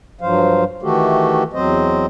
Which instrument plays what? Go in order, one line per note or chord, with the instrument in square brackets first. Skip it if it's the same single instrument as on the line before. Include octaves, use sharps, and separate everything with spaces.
[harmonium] G2 F3 F#3 C5 F5
D#3 E3 A3 F#4 G4 A4
E2 F#3 C4 C5 D#5